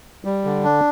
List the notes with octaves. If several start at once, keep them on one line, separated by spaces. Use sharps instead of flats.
G3
D3
D4